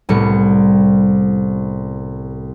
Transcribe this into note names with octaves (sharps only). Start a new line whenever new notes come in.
C2 A2 C3 G3 B3 C#7